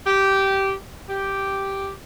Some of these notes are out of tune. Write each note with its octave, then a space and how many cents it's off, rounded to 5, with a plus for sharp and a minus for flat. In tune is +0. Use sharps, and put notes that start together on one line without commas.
G4 -10
G4 -5